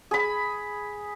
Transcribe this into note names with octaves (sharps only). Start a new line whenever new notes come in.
G#4 B5